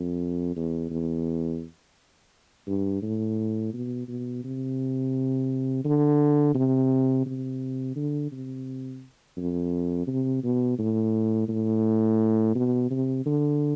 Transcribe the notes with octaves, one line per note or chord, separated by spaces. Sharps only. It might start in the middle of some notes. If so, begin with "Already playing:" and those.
Already playing: F2
E2
E2
G2
A2
B2
B2
C3
D3
C3
C3
D3
C3
F2
C3
B2
A2
A2
B2
C3
D3